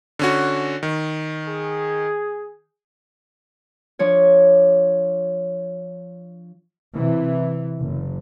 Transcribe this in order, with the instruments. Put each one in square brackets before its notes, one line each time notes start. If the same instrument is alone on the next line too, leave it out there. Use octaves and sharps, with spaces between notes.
[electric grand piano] D3 C#4 F#4
D#3
[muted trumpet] G#4
[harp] F3 D4 C#5
[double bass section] C3 E3
F#1